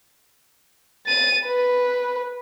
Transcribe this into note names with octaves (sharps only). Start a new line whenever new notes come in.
A6 D#7
B4